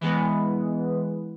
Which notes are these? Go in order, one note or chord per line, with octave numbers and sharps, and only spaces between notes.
E3 G#3 B3